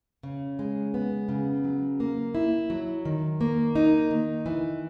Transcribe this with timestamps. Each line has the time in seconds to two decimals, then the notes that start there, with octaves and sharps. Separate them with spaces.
0.23 C#3
0.59 G#3
0.94 B3
1.29 C#3
1.64 F#3
2.00 A#3
2.35 E4
2.70 F#3
3.05 D#3
3.41 A#3
3.75 D#4
4.10 D#3
4.46 E3